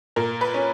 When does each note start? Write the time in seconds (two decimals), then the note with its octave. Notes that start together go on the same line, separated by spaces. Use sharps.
0.16 A#2 A#4
0.41 B4
0.54 C#4